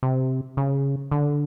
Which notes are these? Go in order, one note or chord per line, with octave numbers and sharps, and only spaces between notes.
C3
C#3
D3